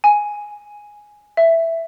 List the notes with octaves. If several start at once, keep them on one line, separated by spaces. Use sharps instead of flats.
G#5
E5